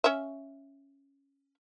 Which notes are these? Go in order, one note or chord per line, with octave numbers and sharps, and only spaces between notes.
C#4 E5